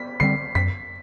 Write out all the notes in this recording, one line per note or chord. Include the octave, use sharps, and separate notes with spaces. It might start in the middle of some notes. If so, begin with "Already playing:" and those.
Already playing: B6
D3 G3 C4 C7
F#2 B6